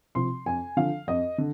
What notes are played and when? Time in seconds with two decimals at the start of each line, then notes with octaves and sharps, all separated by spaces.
0.15 C3 F3 C6
0.46 F2 G#5
0.77 D3 F3 F5
1.07 F2 D#5
1.38 D3